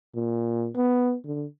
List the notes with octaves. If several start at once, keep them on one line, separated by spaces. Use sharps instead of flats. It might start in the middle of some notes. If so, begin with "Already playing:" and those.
A#2
B3
D3